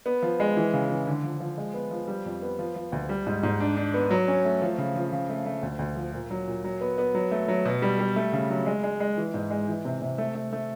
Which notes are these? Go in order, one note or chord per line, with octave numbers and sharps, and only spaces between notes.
B3
F3
G#3
E3
C#3
E3
D3
F3
F3
G#3
B3
F3
G3
F2
B3
F3
F3
D2
G3
G#2
G#2
D4
D4
B3
F#3
C#4
A3
F3
C#3
F3
C#3
A3
A3
D2
D2
F3
A#2
F#3
A#2
F#3
B3
B3
F#3
A3
F#3
B2
G3
G3
A3
C#3
F#3
G#3
G#3
G#3
E3
G#2
G#3
E3
C3
C3
A3
A3
A3